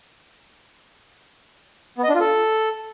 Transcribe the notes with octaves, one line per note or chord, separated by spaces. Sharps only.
B3
D#5
D4
F4
A4